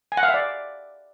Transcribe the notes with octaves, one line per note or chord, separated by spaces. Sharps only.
G#5
F#5
F5
E5
D5